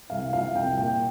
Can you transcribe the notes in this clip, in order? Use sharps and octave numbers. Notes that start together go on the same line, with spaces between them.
C2 F5
F3 F5
C2 G5
A#2 G5